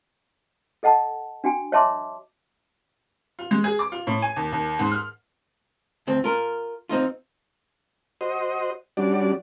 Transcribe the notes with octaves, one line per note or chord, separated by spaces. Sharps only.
A4 D#5 F#5 A5
D4 F#4 G5 G#5
C#5 D#5 E5 A5 C6 D6
F4
G#3
G#4
D6
F4
A2
G#5
D#2
D#2
G#2
F6
D2 C4
F4 A#4
C4 D#4 F4
F#4 C5 D#5
G3 C#4 D4 F#4 D5